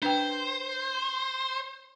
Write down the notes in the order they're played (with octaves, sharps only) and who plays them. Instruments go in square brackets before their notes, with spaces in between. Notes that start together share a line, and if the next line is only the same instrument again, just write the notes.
[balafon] D4 B4 G5 [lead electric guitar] C5